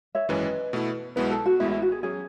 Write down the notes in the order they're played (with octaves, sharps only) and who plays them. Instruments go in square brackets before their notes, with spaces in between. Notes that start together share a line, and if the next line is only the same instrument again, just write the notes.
[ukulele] C#5 E5
[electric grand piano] G#1 F#2 E3 G#3 C#4 [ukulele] B4 D#5
[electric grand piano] B2 A3 E4
[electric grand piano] B1 B2 G#3 B3 E4 [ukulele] B4
[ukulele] A4
F#4
[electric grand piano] A1 A2 G#3 B3 [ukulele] E4
[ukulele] E4
F#4
G#4
[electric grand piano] F#3 C#4 [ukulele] G#4